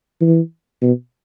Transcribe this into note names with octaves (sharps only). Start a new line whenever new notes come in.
E3
B2